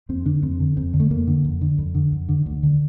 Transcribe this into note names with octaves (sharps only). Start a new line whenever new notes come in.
F2 C4
D3 D4
F2 C4
D3
F2 C4
D3
A3
F2 A#3
D3
F2
D3
F2
D3
F2
D3
D2
D3